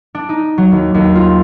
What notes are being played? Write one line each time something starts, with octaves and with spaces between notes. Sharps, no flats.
D4
D#4
F#3
D#2
D#2
F4